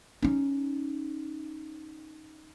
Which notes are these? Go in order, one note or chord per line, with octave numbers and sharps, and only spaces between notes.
C#4 D#4